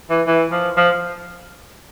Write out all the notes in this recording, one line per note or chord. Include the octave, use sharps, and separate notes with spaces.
E3
E3
F3
F3